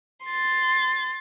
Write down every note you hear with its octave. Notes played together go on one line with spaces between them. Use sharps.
C6 A6